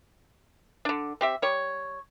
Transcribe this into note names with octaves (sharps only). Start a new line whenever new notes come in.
D3 D4
C4 G4 E5
G3 C#5